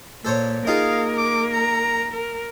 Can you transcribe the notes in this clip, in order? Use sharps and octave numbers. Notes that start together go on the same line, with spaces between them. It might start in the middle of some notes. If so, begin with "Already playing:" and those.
A#2 A4 C5 C#5
A#3 D#4 F4 G#4 A#4 F5
D6
A#5
A#4